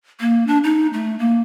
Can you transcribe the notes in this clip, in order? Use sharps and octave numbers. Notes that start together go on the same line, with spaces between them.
A#3
D4
D#4
A3
A#3